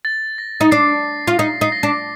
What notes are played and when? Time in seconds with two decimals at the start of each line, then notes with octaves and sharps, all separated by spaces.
0.05 A6
0.38 A#6
0.61 D#4
0.71 D4 C7
1.27 F4
1.38 D#4 A#6
1.61 D#4 C7
1.72 A#6
1.83 D4